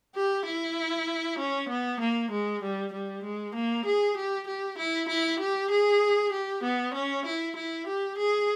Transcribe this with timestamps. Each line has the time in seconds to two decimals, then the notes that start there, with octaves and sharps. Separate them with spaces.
0.16 G4
0.46 E4
1.39 C#4
1.69 B3
2.00 A#3
2.31 G#3
2.63 G3
2.93 G3
3.24 G#3
3.55 A#3
3.86 G#4
4.17 G4
4.48 G4
4.79 E4
5.09 E4
5.40 G4
5.71 G#4
6.33 G4
6.64 B3
6.94 C#4
7.26 E4
7.56 E4
7.87 G4
8.18 G#4